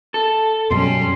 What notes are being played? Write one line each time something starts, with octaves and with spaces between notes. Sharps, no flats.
A4
F#2 B2 G3 C#4 C6